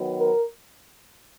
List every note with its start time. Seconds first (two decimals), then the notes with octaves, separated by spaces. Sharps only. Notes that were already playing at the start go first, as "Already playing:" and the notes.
Already playing: D#3 F#3 B3
0.17 A#4